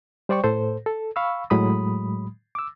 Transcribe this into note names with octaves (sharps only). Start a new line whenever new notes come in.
G3 C5 D5 G5 C#6
A2 A4 C5
A4
F5 B5 C#6 E6
A2 F#3 G#3 B5 D#6
D6 E6